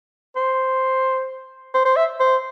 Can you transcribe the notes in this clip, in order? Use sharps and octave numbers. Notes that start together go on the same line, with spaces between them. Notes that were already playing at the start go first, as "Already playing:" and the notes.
C5
C5
C5
E5
C5